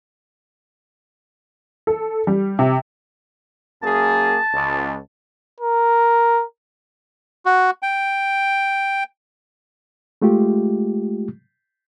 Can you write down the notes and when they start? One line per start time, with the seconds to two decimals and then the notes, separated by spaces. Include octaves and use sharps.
1.87 A4
2.27 G3
2.59 C3
3.83 F#2 A#3 G#4 A5
4.53 C#2
5.60 A#4
7.46 F#4
7.82 G5
10.22 G#3 A3 F4 G4